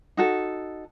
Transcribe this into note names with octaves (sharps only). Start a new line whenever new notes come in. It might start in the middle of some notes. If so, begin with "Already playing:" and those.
D#4 F#4 A4